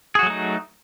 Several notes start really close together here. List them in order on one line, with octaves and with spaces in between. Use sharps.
G#4 F#4 F#3 A3 D#4